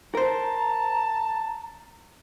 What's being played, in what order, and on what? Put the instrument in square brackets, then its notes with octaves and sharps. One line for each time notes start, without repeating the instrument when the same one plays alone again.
[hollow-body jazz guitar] A#4 C5 [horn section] A5 [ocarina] A#5